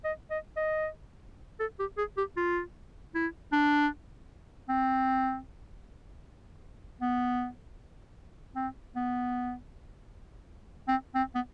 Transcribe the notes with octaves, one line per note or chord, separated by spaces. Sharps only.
D#5
D#5
D#5
A4
G4
G#4
G4
F4
E4
D4
C4
B3
C4
B3
C4
C4
B3